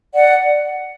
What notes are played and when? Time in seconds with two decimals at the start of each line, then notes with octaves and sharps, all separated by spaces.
0.14 D5 F#5